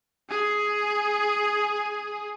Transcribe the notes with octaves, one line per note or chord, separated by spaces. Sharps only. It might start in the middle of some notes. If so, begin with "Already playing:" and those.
G#4 G#5